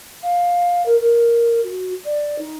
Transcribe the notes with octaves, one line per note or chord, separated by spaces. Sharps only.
F5
A#4
A#4
F#4
D5
D#4